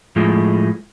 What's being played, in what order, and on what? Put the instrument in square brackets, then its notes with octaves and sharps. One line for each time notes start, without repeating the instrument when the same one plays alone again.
[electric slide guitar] A2 F3 G#3 A3